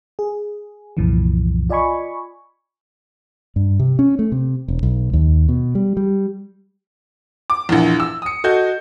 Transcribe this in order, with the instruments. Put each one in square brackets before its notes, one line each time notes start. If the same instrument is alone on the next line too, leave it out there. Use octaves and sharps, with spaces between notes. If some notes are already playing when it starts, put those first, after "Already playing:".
[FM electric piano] G#4
C2 F#2 A#2 E3 F3
F4 D5 D#5 G#5 B5 C#6
[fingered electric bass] G2
C3
C#4
A3
C3
E1
B1
D#2
B2
G3
G3
[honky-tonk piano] D6
A#1 E2
E6
D#6 C#7
F#4 A4 D#5 G6